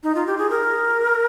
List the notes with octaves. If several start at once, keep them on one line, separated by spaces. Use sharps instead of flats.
D#4
F4
G4
G#4
A#4